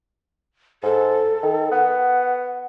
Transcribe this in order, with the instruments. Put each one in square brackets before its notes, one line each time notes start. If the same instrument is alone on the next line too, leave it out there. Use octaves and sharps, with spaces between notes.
[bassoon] G#2 [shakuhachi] A4
[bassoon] D#3
[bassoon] B3 [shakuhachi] F#5